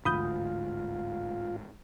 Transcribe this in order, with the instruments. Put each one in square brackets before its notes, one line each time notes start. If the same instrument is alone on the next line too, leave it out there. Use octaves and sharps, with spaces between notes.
[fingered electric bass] A1 G#2 [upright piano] D2 [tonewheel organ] F4 [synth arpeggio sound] B5 D#6 G6